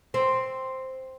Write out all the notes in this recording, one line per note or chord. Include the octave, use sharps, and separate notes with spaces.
C4